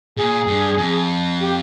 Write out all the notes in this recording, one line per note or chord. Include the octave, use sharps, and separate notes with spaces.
A#2 G#4
G2
F2
G4